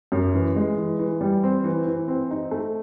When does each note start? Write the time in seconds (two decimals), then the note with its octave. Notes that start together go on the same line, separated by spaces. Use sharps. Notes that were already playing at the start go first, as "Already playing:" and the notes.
0.12 F#2
0.34 E3
0.56 G#3
0.78 E3
0.99 E3
1.21 G3
1.43 C4
1.64 E3
1.87 E3
2.08 C4
2.31 D#4
2.51 A3